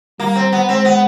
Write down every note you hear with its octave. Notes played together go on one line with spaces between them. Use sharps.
G3 A#3
C4
B3
G#3 C4
B3